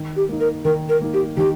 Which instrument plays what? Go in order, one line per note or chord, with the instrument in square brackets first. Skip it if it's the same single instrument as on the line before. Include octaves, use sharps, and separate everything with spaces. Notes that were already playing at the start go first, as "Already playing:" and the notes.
Already playing: [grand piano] D#3
[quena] G4
[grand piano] A#3 D#4
[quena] A#4
[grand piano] D#3 [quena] A#4
[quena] A#4
[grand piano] A#3 D#4
[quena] G4
[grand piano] D#3 [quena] G4